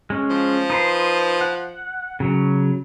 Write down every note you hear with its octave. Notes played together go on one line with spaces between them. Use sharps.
G#3 C#4
F3
D#4 B4 C6
F#5
C#3 F#3